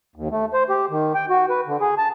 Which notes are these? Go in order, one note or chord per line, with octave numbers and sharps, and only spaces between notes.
D#2
A3
C5
G4
D#3
G5
F#4
B4
D3
G#4
A5